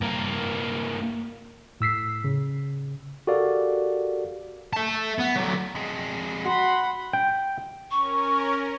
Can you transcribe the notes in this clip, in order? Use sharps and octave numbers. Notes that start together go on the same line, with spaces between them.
G2 A#3
A2 E6 B6 C7
C#3
F#4 G4 A4 A#4 D5 F5
E5 A5
B3
D3 F#3
F2 G#3
F#4 F#5 B5 C6
G5
C#4 A#4 C#6